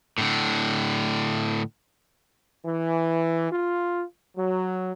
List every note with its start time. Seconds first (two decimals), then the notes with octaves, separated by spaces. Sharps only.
0.18 A2 D3
2.65 E3
3.51 F4
4.36 F#3